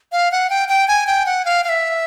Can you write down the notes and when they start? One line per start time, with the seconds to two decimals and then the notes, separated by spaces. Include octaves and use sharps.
0.12 F5
0.32 F#5
0.50 G5
0.69 G5
0.88 G#5
1.07 G5
1.26 F#5
1.45 F5
1.64 F5
1.69 E5